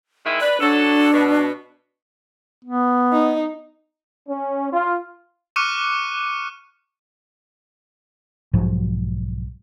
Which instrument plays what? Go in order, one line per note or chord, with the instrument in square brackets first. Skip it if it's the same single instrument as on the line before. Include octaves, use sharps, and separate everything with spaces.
[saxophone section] D#3 G#3 E4
[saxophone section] B4 [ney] D5
[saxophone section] F#3 A4 [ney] D4
[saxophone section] B2
[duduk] B3
[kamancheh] D#4
[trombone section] C#4
F4
[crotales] C#6 D6 F6 F#6 C#7 D#7
[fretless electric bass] B1 G#2 F3 F#3